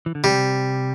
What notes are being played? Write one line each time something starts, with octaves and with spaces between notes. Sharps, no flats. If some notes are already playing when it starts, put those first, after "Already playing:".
E3
D3
C3 G3